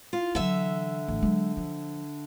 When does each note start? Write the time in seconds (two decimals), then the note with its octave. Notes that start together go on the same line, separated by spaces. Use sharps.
0.13 F4
0.35 D3 E3 F#3 E5
1.08 A1
1.22 F#3 G#3
1.57 F3